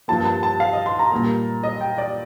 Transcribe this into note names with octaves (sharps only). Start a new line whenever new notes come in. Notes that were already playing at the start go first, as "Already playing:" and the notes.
G2 F3 A#3 A5
A5
A5
F5
D#5
C6
A#5
A#2 G3 A#3
D#5
G5
D5